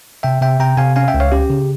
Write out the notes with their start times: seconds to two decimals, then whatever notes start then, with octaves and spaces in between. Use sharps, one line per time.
0.23 C3 E5 G5
0.42 C3 E5 G5
0.60 C3 G5 A#5
0.77 C3 F5 G#5
0.96 C#4 F5 G#5
1.08 E5 G5
1.14 C#2
1.20 C#5 F5
1.32 C#4 G4
1.50 C#3